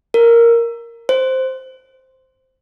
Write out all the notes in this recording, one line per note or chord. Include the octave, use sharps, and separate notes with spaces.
A#4
C5